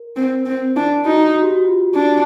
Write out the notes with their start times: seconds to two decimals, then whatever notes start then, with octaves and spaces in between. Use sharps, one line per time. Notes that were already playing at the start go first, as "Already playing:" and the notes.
Already playing: A#4
0.16 C4
0.45 C4
0.76 D4
1.05 D#4 F#4
1.35 F#4
1.43 G4
1.51 F#4
1.65 F4
1.95 D4